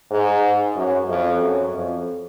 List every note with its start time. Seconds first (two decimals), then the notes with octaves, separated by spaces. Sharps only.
0.11 G#2
0.76 F#2
1.09 F2
1.41 F#2
1.73 F2